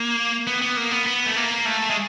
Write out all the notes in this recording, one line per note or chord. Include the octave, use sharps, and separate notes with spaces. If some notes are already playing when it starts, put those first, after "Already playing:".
Already playing: A#3
B3
B3
A#3
B3
B3
A3
A#3
A3
G#3